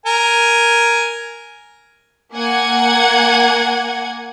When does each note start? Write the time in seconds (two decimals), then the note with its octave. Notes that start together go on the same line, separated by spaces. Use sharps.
0.06 A#4 G#5
2.35 A#3 F#5 G#5 G#6